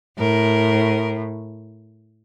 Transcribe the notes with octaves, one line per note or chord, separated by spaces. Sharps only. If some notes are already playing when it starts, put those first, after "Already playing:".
A2 A#4